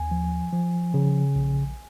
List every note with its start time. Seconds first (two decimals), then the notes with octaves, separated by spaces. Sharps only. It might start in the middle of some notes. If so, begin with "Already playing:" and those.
Already playing: D#2 G#5
0.11 F3
0.53 F3
0.94 C#3
1.35 A#1